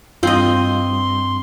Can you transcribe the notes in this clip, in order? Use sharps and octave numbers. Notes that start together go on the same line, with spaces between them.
G2 C4 F4 D#5 C6